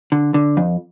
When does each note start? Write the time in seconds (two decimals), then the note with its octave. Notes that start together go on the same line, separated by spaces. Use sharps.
0.12 D3
0.34 D3
0.57 F2